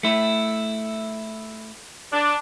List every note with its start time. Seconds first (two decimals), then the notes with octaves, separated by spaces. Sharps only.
0.03 A3 E4
2.12 D4